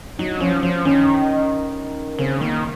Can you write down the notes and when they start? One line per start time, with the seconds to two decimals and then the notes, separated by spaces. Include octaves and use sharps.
0.19 F#3 D#4
0.40 F3 C#4
0.63 F3 C#4
0.85 D#3 C#4
2.18 C#3 C4
2.41 D#3 A#3